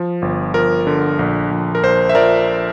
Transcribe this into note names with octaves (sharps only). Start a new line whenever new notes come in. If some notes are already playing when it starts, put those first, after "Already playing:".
Already playing: F3
G1
F3 A#4
D3
A#1
A#1
A#4
A#1 C5
E5
F3 A#4 D5